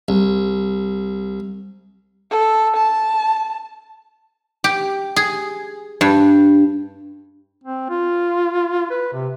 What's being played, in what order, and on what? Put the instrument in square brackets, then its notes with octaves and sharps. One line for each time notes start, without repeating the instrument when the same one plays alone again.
[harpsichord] C2
[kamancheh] A4
A5
[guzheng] G4
G#4
G2
[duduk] C4
F4
B4
C3